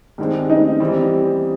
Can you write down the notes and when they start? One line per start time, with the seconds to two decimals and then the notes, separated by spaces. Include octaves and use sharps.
0.18 G2 D#3 G#3 C4
0.50 D#4
0.80 E3 G3 C4